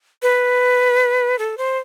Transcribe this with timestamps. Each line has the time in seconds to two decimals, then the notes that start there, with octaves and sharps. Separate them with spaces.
0.22 B4
1.39 A4
1.58 C5